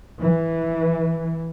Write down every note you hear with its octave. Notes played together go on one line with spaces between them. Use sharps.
E3